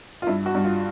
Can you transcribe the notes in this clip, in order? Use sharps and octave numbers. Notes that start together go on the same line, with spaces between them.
F4
G2 E4
F#4
G2
F4